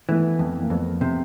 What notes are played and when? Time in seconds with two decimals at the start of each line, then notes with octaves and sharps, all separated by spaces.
0.09 E3 A3 B3
0.39 F2
0.63 A#3
0.70 F2 A3 B3
1.01 C3